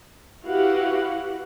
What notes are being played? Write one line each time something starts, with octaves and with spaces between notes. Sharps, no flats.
E4 F#4 G4 B4 F5 F#5